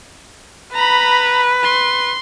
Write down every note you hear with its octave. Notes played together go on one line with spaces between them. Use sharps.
B4 A#5 B5
C6